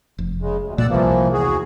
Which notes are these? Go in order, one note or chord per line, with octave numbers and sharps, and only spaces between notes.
F1
C#3 G#3
D2
A#2 A#3 D5 F#5 E6
C2 C3 E3 F3 A#3
E2 F#4 G#4